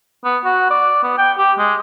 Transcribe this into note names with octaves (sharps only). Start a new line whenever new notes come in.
B3
F#4
D5
B3
G5
G4
G#3